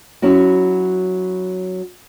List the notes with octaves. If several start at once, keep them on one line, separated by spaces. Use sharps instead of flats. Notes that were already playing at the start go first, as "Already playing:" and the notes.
F#3 C#4 E4 F#4